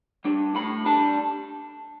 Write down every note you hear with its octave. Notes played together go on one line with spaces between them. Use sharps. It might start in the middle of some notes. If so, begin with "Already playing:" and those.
G3 D4
A2 B5
G3 D4 A5